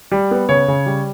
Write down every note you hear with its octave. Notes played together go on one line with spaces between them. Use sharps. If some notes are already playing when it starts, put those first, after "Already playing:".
G3
B3
C#3 C#5
C#3
G3